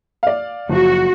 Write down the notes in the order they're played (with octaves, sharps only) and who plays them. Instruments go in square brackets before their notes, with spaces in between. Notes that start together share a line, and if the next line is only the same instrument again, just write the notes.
[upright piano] D5 F5
[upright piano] F#1 F3 [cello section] F#4